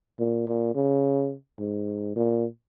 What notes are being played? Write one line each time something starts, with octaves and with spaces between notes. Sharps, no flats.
A#2
A#2
C#3
G#2
A#2